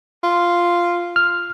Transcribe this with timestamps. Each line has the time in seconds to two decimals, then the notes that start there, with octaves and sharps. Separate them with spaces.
0.23 F4
1.16 F6